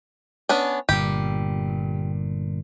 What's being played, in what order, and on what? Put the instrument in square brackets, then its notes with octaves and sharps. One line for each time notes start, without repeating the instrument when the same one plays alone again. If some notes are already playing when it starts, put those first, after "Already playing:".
[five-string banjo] B3 C#4 D4
[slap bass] G1 A#2 [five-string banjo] G4